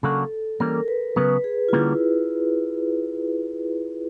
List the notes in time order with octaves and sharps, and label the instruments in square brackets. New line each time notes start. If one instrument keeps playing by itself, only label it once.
[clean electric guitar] C#3 F#3 A#3 D4 F#4 [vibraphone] A4
[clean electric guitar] E3 G3 A#3 C#4 [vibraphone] A#4
[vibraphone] B4
[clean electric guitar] C#3 F#3 B3 [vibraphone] B4
[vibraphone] G#4
F4
[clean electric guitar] D3 G3 A#3 C#4 [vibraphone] E4